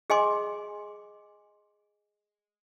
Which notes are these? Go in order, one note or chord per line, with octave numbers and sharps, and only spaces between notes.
G#4 D#5 G#5 C6 D6